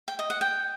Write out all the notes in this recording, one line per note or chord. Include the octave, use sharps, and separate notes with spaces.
G5
D#5
F#5
G5